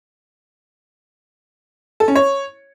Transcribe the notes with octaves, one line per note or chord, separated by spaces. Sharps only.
A4
C#4
C#5